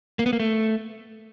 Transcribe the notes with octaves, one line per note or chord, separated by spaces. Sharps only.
A#3
B3
A#3
A3